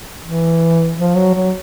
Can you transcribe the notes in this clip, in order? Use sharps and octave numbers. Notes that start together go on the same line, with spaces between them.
E3
F3
F#3
F#3